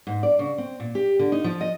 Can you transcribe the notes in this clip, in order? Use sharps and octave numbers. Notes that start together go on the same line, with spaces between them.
G#2
D5
C#3
C4
A#2
G4
D3
D#4
F3
D#5